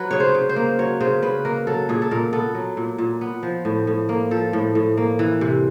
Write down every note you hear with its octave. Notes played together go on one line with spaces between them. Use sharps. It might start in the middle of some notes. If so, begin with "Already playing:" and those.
Already playing: F#3 B4
C#3 C#5
C5
C#3
C5
A#3
F#3 C#5
C#3 C5
C#3 B4
A#3 A#4
F#3 A4
A#2 G#4
A4
A#2 A#4
B3 A4
F#3
A#2
A#2
B3
F3
A2
A2
A#3
F3 A4
A2
A2
A#3
E3
C3